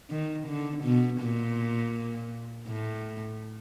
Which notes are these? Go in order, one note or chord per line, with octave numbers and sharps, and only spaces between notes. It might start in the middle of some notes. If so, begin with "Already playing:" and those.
D#3
D3
B2
A#2
A2